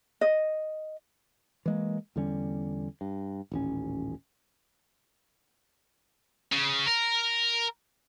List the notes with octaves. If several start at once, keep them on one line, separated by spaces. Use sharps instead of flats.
D#5
E3 G#3 A#3
E2 D3 G3 C#4
G2
D#1 A1 C#4
C#3
A#4